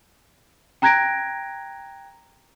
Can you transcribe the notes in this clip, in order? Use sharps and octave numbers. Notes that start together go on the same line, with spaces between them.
G5 A#5 F#6 G#6 A#6 D7